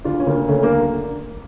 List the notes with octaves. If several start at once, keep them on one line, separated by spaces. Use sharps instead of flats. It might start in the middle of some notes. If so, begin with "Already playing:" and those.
D2 D4 F4
C#4
D2 A#3
D2 A3 C#4
A#3 D4
D3